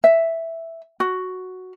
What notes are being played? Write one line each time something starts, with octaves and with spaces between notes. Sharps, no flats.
E5
F#4